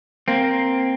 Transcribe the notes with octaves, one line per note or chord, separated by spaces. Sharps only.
A#3 C4